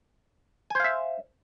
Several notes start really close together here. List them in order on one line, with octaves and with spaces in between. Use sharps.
G#5 C5 F5 E5